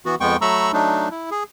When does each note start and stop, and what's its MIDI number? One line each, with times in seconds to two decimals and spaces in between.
0.05 0.15 52
0.05 0.15 59
0.05 0.15 66
0.21 0.37 41
0.21 0.37 56
0.21 0.37 59
0.21 0.37 79
0.21 0.37 85
0.42 0.72 54
0.42 0.72 57
0.42 0.72 82
0.42 0.72 83
0.42 0.72 85
0.42 0.72 88
0.73 1.09 54
0.73 1.09 57
0.73 1.09 62
0.73 1.09 63
1.11 1.30 64
1.31 1.44 68